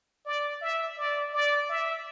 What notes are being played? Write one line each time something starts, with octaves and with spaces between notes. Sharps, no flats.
D5
E5
D5
D5
E5